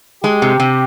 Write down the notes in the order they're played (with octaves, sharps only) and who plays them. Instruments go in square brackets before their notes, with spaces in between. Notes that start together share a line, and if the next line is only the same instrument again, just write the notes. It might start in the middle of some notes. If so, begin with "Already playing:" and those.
[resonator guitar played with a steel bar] G#3 [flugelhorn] G4
[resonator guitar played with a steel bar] C3
C3